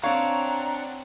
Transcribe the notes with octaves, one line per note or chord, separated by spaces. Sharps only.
C4 D4 C#5 F5 F#5 A#5